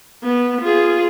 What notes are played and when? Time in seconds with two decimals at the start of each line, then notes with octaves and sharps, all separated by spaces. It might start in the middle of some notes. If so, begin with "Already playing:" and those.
0.23 B3
0.62 F4 G#4